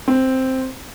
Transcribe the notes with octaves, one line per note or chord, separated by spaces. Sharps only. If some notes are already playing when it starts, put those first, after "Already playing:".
C4